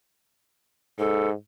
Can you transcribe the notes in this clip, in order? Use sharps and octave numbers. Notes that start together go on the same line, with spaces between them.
G#2 A4